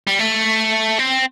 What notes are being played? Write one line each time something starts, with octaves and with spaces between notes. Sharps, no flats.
G3
A3
C4